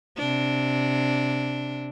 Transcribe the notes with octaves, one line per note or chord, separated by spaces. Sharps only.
C3 D4